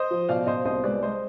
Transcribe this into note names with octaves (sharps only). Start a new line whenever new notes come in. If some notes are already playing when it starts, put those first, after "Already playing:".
Already playing: C5 D#5
F3
B2 D5 F5
B2 C5 D#5
C2 C5 D#5
G#3 B4 D5
G#3 C5 D#5